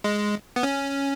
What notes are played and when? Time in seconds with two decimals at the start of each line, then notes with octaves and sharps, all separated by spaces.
0.04 G#3
0.56 B3
0.63 C#4